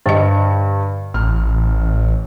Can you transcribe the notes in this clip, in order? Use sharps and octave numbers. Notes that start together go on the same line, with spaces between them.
G2 D3 D#5
A1 F6